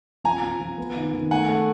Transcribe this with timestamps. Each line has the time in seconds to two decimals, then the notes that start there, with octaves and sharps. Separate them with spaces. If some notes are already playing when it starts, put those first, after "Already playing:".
0.24 F3 G#5 A#5
0.43 F3
0.61 F3
0.78 B3
0.96 D#3
1.14 D#3
1.31 A3 F#5 G#5
1.49 A3